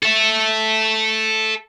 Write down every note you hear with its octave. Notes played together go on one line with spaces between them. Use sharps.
A4 E5